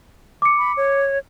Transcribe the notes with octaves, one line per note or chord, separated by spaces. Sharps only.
D6 C#7
B5
C#5